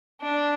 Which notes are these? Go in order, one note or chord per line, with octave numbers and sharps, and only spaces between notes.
D4